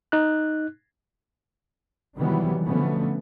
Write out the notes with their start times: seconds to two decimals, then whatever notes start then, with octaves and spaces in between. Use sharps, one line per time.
0.12 D#4 F#6
2.16 C3 D#3 E3 F#3 G3 B3
2.64 B2 D3 F3 A3 B3 C#4